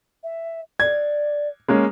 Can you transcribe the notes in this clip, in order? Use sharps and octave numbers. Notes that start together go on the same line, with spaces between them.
E5
D5 G#6
G#3 A#3 C#4